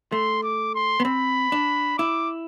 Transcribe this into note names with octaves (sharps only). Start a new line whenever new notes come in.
A3 C6
D6
C6
B3
C4 B5
D4
E4 D6